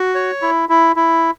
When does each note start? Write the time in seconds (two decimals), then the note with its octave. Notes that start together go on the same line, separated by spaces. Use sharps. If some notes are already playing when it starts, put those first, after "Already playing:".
Already playing: F#4
0.15 C#5
0.42 E4
0.69 E4
0.96 E4